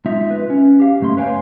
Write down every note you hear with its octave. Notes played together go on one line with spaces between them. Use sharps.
G#3 C4 D#4 F4 E5
B4
C#4
G4 F5
C#2 G2 A3 A#3 C6
B4 C#5 F5 G5 G#5